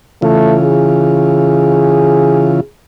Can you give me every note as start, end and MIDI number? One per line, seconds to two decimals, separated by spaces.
0.22 2.60 49
0.22 2.60 52
0.22 0.57 57
0.22 2.60 65
0.64 2.67 68